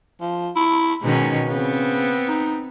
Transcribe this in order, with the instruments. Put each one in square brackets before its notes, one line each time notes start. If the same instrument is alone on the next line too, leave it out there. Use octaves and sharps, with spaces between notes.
[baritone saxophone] F3
E4
[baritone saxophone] G#2 [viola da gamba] B2 D#3 C#4
[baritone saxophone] C#3 [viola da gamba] B3 C4
[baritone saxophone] D#4